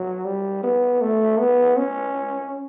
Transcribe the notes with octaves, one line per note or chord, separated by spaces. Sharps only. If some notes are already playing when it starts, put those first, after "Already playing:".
Already playing: F#3
G3
B3
A3
B3
C#4